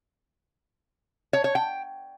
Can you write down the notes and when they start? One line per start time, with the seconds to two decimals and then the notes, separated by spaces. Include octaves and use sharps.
1.33 C#5
1.44 C#5
1.55 G5